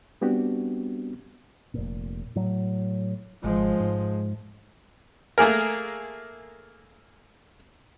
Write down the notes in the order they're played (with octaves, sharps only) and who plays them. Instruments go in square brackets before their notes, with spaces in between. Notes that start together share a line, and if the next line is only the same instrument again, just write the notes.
[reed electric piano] G3 B3 C4 D4 F#4 G4
[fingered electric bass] F1 A#2
A2 F#3
[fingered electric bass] G#1 [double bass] F3 G#3
[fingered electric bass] G#2
[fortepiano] A3 A#3 G#4 A#4